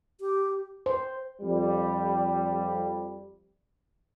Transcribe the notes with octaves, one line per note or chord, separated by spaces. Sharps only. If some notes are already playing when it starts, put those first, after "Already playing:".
G4
C5
F2 G3